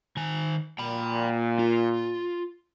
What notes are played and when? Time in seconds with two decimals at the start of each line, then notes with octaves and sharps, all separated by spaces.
0.17 D#3 G#5
0.79 A#2 G5 B5
1.59 F4